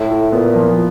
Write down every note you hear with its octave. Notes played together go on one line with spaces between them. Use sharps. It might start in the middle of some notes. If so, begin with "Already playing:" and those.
Already playing: A2 E4
E4
A#2 B3
F3